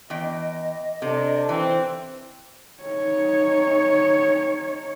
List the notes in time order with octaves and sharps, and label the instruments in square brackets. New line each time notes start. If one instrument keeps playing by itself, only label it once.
[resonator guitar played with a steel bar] E2 G5 [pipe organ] D#5
[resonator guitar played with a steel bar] C3 [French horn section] D4 A4
[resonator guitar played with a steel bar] E3 [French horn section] C4
[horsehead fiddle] D#4 C#5